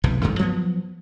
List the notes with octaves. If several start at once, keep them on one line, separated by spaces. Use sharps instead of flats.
F1 B1 G#2 E3
A1 G2 D#3 A3
F3 F#3 A#3 B3